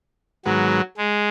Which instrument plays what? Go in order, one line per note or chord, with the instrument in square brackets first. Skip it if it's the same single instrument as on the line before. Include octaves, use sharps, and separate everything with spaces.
[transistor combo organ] G#2 D#3 G#3 B3 F#4 [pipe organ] F#3
[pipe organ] G#3